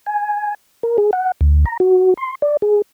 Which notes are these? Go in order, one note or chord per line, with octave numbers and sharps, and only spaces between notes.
G#5
A#4
G#4
F#5
D2
A#5
F#4
C6
D5
G#4